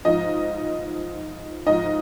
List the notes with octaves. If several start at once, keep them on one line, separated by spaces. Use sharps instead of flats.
G#2 F3 D#5
G#2 F3 D#5